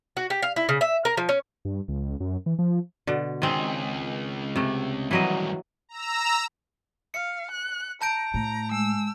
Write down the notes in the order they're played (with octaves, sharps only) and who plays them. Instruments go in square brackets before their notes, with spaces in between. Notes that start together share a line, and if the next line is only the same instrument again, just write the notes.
[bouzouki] F#4
G4
F5
E4
C#3
E5
A#4
F3
C#4
[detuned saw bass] G2
C#2
F#2
E3
F3
[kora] B2 D3
[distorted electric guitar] C#2 G#4 [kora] D#3 C4
[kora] C3 A3
[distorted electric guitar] G2 D#3 [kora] E3 F#3 D#5
[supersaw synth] A#5 E6
[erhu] F5 [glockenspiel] C#7
[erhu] F#6
[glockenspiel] A5 G6 D7 [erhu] A#5
[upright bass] A2 [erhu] A#5
[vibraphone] G#3 [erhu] E6